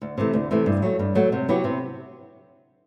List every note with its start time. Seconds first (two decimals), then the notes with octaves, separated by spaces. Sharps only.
0.02 D2
0.18 C3 E3 A3
0.33 D2
0.51 C3 E3 A3
0.66 G2
0.82 F#3 A3
0.99 G2
1.15 F#3 A3
1.32 C3
1.49 F#3 B3 E4 G4
1.64 C3